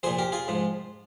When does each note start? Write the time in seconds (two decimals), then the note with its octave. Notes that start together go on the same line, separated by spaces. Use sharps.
0.03 A#2 F3 G#4 C5
0.18 G4 A#4
0.32 F4 G#4
0.48 G#2 F3